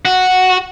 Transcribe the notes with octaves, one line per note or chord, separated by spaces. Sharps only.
F#4